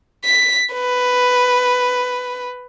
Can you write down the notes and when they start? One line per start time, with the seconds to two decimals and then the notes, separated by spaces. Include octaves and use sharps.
0.25 B6
0.74 B4